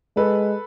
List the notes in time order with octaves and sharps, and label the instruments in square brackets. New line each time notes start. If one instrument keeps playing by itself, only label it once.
[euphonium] G#3 [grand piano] A4 B4